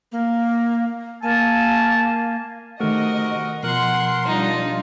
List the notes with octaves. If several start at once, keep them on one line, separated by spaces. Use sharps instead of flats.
A#3
A#3 A#4 G#5 A5
C3 D#3 A3 F#4 A#4 D#5
B2 F3 A#4 F#5 C6
G3 D4 D#4 F4